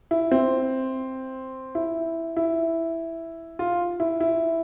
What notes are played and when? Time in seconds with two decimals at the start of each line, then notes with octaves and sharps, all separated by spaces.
0.11 E4
0.32 C4
1.75 E4
2.37 E4
3.59 F4
4.00 E4
4.20 E4